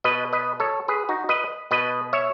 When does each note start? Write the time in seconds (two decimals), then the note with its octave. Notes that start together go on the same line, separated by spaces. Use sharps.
0.04 B2 B4 D#5
0.33 B4 D#5
0.60 A4 C#5
0.88 G#4 B4
1.09 D#4 F#4
1.29 B4 D#5
1.71 B2 B4 D#5
2.13 C#5 E5